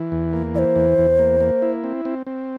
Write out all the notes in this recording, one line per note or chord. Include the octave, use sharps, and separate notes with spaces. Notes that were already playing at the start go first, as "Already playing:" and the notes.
Already playing: E3
E2
A#3
E3 C5 D5
E2
E2
A#3
A#3
E4
C4
C4
C4